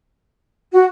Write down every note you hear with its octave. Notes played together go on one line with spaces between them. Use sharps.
F#4